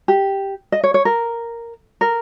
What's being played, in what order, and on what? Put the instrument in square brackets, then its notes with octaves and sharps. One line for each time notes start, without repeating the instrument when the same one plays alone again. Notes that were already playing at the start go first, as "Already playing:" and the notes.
[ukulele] G4
D#5
C#5
C#5
A#4
A#4